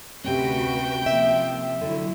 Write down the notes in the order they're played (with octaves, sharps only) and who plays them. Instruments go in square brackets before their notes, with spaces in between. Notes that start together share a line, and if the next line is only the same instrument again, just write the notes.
[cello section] D2 F#4 B4 [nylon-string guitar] C3 C#4 [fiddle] G5
[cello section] F3 A#3 [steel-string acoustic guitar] E5
[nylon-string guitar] D3 [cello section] F#3 E4